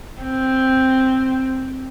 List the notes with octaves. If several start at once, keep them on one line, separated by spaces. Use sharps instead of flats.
C4